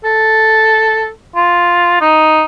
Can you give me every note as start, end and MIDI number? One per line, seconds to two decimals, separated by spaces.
0.04 1.09 69
1.36 2.00 65
2.01 2.45 63